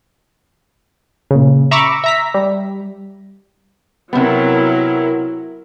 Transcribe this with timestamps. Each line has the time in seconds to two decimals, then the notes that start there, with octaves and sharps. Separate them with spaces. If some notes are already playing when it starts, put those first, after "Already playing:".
1.31 A#2 C#3
1.71 E5 A#5 B5 C#6 D6 E6
2.04 E5 A#5 B6
2.34 G3
4.13 C3 F#3 B3 E4 A#4